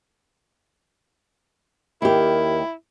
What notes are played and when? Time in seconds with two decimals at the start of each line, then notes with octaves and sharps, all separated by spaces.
2.02 D#2 E4 G4 A#4